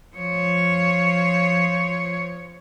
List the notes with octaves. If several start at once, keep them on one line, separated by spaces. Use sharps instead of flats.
F3 C#5